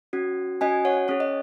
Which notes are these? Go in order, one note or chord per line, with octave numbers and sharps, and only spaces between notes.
C#4 F#4
C#4 F#4 D#5 G#5
C#5 F#5
C#4 G#4 C#5
D#5